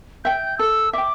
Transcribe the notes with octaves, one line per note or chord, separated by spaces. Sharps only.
E5 G5 G6
A4 E6
E5 G5 D6